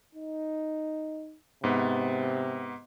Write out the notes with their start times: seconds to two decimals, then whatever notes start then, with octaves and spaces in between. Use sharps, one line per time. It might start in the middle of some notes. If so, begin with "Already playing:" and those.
0.15 D#4
1.64 G#2 C3 B3